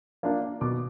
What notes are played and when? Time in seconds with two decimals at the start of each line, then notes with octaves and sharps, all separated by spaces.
0.23 A#3 D4 F4
0.61 B2 D6